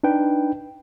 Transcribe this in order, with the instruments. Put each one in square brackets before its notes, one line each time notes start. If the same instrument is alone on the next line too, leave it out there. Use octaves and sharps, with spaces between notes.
[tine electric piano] D4 D#4 B4 G5